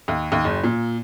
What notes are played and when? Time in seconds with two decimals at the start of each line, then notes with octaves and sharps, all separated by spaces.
0.08 D#2
0.32 D#2
0.45 F#1
0.64 A#2